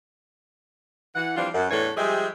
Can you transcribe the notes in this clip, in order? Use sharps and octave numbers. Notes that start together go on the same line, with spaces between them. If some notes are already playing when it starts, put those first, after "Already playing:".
E3 F#5
E3 F3 G3 C4 D4 F4
F#2
E2 A2 E3 D4 A4 C#5
F3 G3 G#3 G4 G#4 E5